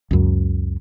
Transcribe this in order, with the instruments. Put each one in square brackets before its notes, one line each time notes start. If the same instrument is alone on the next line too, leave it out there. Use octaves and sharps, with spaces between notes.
[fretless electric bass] C#2 F#2